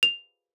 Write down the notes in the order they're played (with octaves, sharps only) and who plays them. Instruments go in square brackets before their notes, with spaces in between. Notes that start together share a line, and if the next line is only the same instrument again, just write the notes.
[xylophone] F7